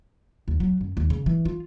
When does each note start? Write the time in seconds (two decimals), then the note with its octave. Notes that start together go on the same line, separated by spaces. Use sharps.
0.48 D#2
0.60 F#3
0.81 F#2
0.97 D#2
1.10 C#3
1.26 E3
1.45 F4